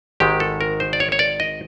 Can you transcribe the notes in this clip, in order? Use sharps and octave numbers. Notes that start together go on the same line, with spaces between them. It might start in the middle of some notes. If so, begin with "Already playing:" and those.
G#1 G#2 D#3 G#3 G4
A4
A#4
C5
D5
C#5
C#5
D5
D#5